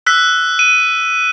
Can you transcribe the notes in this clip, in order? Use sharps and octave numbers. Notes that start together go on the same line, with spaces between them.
E6 F#6 B6
D#7